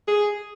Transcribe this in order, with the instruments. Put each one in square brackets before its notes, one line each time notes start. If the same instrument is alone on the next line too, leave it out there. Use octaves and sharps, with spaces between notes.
[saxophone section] G#4